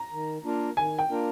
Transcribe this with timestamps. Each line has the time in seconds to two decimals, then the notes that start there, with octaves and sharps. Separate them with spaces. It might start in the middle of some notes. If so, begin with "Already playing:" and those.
Already playing: A#5
0.12 D#3
0.45 A#3 D4 F4 A#4
0.77 D#3 G#5
0.99 G5
1.10 A#3 D4 F4 A#4